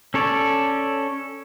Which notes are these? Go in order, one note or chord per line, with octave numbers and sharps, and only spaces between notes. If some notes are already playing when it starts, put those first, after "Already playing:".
C#4 A4 C#5 D5